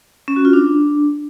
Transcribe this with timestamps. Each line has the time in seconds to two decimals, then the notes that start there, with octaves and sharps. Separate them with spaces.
0.28 C#4
0.36 F#4
0.45 F4
0.53 D4